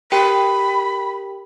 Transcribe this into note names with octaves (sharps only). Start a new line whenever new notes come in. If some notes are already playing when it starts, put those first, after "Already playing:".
G4 A#4 G5 B5